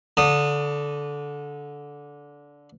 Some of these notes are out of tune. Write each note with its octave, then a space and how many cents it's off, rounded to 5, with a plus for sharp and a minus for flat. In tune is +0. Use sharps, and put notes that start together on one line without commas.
D3 -15 A5 +35 D#6 -10